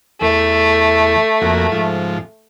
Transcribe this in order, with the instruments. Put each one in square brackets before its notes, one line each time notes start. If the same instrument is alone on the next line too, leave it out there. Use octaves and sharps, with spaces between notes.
[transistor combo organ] E2 [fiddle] A3
[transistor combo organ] F2 A#3 F#4
G#2 F3